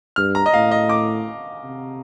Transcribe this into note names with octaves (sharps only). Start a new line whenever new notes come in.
G2 F6
A#5
D#5
A2 F5
D#5
D6
C3